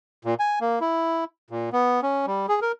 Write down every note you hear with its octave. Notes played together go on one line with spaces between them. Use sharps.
A#2
G#5
A#3
E4
A#2
B3
C#4
G3
G#4
A#4